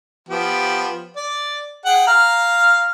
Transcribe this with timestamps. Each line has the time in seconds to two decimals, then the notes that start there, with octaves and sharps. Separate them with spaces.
0.29 F3 B3 G4
1.16 D5
1.85 G#4 F#5 G5
2.07 F5 A#5 F6